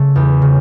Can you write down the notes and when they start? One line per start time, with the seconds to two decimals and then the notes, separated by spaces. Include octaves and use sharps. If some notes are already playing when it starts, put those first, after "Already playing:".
Already playing: C#3 A3
0.16 E2
0.42 C#3